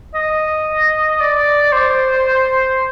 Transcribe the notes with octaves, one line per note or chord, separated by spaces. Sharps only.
D#5
D5
C5